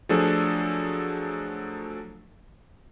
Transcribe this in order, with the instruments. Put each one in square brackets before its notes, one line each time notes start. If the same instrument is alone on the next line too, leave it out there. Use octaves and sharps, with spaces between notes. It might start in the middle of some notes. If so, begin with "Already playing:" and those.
[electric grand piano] F3 F#3 A3 D4 G#4 A4